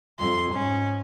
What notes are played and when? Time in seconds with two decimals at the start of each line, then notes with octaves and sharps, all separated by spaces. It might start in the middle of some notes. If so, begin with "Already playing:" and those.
0.19 F2 C6
0.53 G#2 C#4